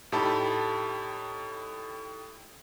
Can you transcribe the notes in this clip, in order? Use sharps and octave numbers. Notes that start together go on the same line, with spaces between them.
A2 D#4 G4 A4 A5 B5